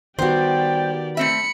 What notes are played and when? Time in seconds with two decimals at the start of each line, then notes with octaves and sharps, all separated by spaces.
0.18 D#3 G3 B3 F#4 G4 C5 D5 G5
1.17 A3 C4 E5 B5 C#7